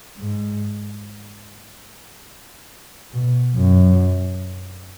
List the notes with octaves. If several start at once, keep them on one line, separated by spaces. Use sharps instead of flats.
G#2
B2
F#2